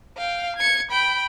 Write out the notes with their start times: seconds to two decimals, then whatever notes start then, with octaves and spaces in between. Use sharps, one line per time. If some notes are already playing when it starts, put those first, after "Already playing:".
0.17 F5 G5
0.56 G#6 C#7
0.91 G5 B5